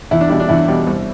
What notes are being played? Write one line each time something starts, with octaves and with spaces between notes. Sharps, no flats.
E2 E4
D4
B2 G3 E4
D4
E2 E4
B2 G3
C2